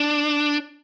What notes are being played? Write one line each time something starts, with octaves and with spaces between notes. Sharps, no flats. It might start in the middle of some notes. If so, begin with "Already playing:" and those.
Already playing: D4